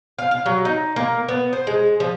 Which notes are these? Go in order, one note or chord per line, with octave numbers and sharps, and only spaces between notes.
F5
F5
F#3
D#4
A#3
B3
C5
G#3
F3